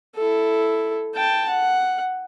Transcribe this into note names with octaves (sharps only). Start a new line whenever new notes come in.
E4 A4
G5 A5
F#5